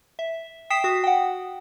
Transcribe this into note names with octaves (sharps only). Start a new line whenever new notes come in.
E5
G5 D#6 B6 C7 E7
F#4 D#6
F#5 G5